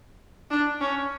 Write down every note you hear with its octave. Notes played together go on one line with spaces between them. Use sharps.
D4
C#4